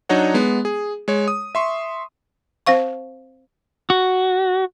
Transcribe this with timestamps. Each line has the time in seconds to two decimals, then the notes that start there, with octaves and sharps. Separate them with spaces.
0.09 F#3 D4 D#4 C#5 D#5 F#5
0.34 G#3 B3
0.65 G#4
1.08 G#3 C#5
1.28 D#6
1.55 E5 C6 C#6
2.66 C4 C5 F5 C#6
3.90 F#4